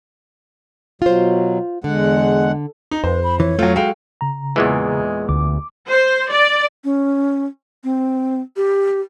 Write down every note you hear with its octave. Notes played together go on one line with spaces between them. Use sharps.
B2 F#3 F4 C5
E2 D3 G#3 F#5
D#4
F2 B4 C5
B5
E3 C#5
F#3 A3 F4
G#3 F#4 A4 F5 G5
C#3 A#5
E2 A#2 E3 G#3
D2 D6
C5
D5
C#4
C4
G4